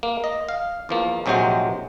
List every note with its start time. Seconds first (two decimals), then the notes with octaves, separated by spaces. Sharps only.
0.03 A#3
0.24 D#5
0.49 F5
0.89 E2 F3 A#3
1.26 A#1 C3 F#3 G#3 C5 G5